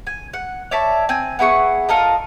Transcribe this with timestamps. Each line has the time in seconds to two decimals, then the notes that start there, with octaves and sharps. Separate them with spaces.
0.07 G#5
0.33 F#5
0.71 C#5 D5 E5 A5
1.09 C4 G#5
1.39 B3 E4 G#4 C#6
1.89 F4 A4 A#4 D#5